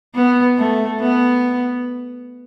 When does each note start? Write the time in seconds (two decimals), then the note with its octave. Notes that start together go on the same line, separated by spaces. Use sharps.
0.15 B3
0.58 A3
1.00 B3